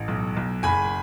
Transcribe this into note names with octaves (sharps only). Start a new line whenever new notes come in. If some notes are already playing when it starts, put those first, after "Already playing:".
Already playing: A1
B1
B1
F#1 G#5 B5